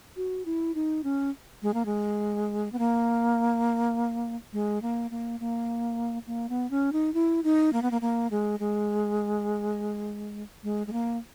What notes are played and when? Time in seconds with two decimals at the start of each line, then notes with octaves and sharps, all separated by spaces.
0.16 F#4
0.45 E4
0.75 D#4
1.04 C#4
1.62 G#3
1.74 A#3
1.86 G#3
2.73 B3
2.79 A#3
4.53 G#3
4.82 A#3
5.11 A#3
5.40 A#3
6.27 A#3
6.49 B3
6.71 C#4
6.93 D#4
7.14 E4
7.44 D#4
7.73 A#3
7.82 B3
7.91 A#3
8.01 A#3
8.31 G#3
8.60 G#3
10.63 G#3
10.87 G#3
10.93 A#3